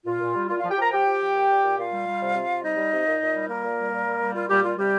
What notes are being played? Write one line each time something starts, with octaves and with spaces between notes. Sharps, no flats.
A#2 F4
A#2
G3
A#2 F4
F3 F4 F5
G4 G5
F3 A#4 A#5
F3 G4 G5
F3
F3
A#2
A#2
A#2
A#2 F4 F5
G3
G3
C3
C3
C3
G3 D#4 D#5
G3
C3
A#2
A#2
G3
A#2 A#3 A#4
A#2
G3
A#2
G3
G3
A#2 F4
A#2 G3 G4
G3 F4
C3 G3 G4